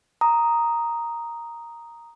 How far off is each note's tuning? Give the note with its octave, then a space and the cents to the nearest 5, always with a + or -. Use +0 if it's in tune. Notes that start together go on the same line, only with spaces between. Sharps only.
A#5 +0 D#6 +0